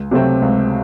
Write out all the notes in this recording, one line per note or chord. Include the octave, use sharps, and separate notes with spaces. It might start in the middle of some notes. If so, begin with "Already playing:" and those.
Already playing: C#2
C3 F#3 A3 C4
C#2